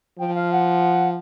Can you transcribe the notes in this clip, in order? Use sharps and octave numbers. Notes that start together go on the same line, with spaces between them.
F3 G5
F5
F#5